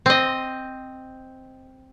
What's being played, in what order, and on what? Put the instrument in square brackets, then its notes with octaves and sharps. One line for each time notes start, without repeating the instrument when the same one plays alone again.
[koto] C4 D#5